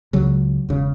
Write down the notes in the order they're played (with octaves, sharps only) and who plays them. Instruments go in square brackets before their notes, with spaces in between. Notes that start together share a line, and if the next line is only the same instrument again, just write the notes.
[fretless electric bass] C#2 C#3 F#3
E1 C#3